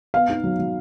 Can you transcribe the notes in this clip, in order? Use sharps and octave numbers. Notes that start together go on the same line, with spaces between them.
B3 F5
D#4
F#3
F#3